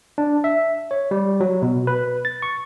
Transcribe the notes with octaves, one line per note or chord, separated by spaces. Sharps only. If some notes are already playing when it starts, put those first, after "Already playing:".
D4
E5
C#5
G3
F#3
B2
B4
A6
C#6